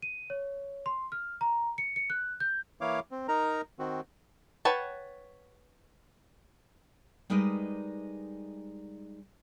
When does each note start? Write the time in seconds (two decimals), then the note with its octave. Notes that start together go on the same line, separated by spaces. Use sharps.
0.02 D#7
0.30 C#5
0.86 C6
1.12 F6
1.41 A#5
1.78 C#7
1.96 C#7
2.10 F#6
2.40 G6
2.81 E3 A#3 E4 C#5 F5 D6
3.11 C4
3.28 D#4 A#4 A#5
3.79 D#3 C4 F#4
4.65 B4 C#5 F#5 G5 A5
7.30 G3 G#3 D#4 A#4 B4 D5